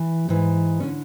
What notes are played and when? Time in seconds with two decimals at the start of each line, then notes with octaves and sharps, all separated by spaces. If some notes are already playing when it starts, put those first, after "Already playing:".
Already playing: E3
0.29 G#2 E3
0.80 D3 C#4